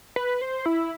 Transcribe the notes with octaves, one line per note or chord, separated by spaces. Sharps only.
B4
C5
E4